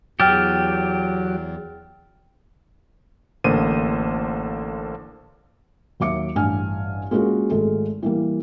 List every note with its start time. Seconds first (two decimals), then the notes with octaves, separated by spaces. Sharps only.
0.20 E2 F#3 G4 G5 F6 A6
3.44 A1 D3 A#3 C5 D#7
6.00 D#2 F#3 E5 D6 C#7
6.35 A1 G2 G#5 F6
7.11 G#3 A#3 C#4 F4 F#4 A#4
7.50 G#1 G#3 A3 A4
8.03 E3 G3 A#3